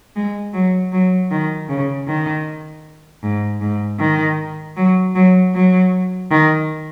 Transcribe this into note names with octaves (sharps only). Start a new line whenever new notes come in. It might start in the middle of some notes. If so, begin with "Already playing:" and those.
G#3
F#3
F#3
D#3
C#3
D#3
G#2
G#2
D#3
F#3
F#3
F#3
D#3